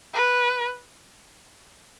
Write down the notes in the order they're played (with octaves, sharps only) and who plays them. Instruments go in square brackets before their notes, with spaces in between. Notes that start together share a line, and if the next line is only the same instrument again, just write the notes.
[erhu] B4